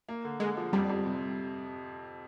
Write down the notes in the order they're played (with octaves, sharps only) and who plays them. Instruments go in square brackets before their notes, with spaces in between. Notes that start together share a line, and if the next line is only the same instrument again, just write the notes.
[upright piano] A#3
D3
[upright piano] D3 [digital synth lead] G#3
[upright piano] F3
[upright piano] F2 [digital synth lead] G3
[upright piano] F2
C3